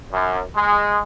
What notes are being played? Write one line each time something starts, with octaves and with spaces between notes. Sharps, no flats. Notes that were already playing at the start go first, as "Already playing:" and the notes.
F#2
G#3